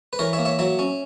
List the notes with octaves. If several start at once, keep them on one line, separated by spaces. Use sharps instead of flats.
B4
E3 A#4 C#5
C#5 E5
A#3
C#5 E5
F#3 C#5 E5
C#4